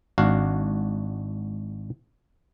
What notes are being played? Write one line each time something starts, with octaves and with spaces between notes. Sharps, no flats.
G#1 D4 F#4 F5